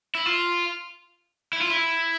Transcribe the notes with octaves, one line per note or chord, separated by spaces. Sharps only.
E4
F4
E4
F4
E4